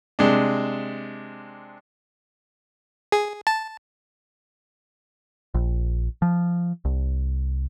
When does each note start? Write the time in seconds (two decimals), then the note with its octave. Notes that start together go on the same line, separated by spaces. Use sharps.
0.19 C3 G#3 D4
3.12 G#4
3.47 A5
5.54 A#1
6.22 F3
6.85 C2